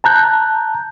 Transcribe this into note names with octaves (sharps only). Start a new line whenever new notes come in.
A5 A#5 F#6 G6